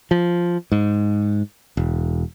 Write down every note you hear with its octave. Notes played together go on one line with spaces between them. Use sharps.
F3
G#2
E1